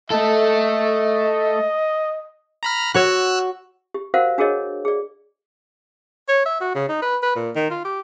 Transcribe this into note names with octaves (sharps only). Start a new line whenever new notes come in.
A3 A4 D#5
A#5 B5 F6
F#4 C#5 E6 F#6
G4
F#4 A#4 C5 F5 F#5
D4 F#4 G#4 A#4 C#5 D#5
G#4 D5
C#5
E5
F#4
C#3
D#4
B4
B4
A#2
D#3
F4
G4